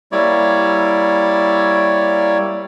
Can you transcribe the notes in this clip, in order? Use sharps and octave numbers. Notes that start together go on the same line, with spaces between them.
G3 A#3 E4 C#5 D5